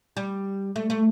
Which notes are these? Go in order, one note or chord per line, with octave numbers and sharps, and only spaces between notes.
G3
A3
A3